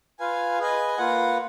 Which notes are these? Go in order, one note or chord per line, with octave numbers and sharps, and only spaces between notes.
F4 B4 F5 G#5
G#4 B4 D#5 G#5
A#3 F4 B4 F#5